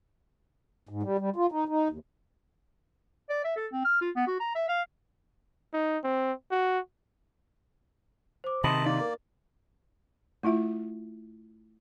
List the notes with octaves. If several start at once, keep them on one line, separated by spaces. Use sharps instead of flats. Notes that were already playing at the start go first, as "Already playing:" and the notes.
G#2
G3
G3
F4
D#4
D#4
D#2
D5
E5
A4
C4
F6
F4
B3
F#4
A#5
E5
F5
D#4
C4
F#4
C5 D6
C3 D#3 D#5 A5 B5 C6 F#7
A#3 D#4 D5
A#4
A3 E4 F4 E5